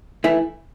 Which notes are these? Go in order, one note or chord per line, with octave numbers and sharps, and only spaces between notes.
E3 A3 E4